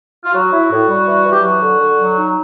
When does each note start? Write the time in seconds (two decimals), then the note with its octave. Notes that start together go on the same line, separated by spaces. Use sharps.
0.24 F4
0.33 F#3 F#4
0.52 E4
0.70 A2
0.88 G3
1.06 E3
1.24 E3
1.31 G4
1.43 F#3 F#4
1.61 D3
1.79 D3
1.98 F#3
2.15 D#4